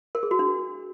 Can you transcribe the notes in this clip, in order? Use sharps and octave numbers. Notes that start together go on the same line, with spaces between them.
A#4
G#4
F#4
D4